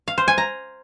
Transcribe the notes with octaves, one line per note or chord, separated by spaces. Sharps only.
F5
C5
G#5
A#5